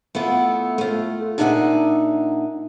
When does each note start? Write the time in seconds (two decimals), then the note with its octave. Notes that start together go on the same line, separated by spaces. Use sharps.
0.15 A3 B3 E4 F4
0.78 A3 F4
1.38 A#2 D4 D#4 E5 F#5 G#5